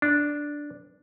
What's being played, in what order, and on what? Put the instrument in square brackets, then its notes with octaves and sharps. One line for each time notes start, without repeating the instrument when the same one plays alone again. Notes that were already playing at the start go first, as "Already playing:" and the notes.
[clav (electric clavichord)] D4